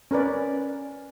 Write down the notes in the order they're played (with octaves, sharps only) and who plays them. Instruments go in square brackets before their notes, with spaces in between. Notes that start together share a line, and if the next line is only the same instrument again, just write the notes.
[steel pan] C#4 A#4 B4 D5